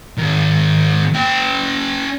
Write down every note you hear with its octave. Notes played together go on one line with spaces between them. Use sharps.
G#2 D#3
C#4 G5